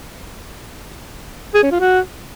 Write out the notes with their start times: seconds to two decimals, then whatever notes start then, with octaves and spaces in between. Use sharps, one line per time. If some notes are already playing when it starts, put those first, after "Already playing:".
1.54 G#4
1.63 C#4
1.71 F4
1.80 F#4